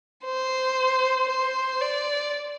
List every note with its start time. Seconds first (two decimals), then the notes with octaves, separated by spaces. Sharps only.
0.25 C5
1.29 C5
1.81 D5